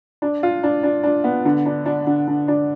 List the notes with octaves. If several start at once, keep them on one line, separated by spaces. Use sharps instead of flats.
D4
F4
D4
D4
D4
B3
D3
D4
D4
D3
D3
D4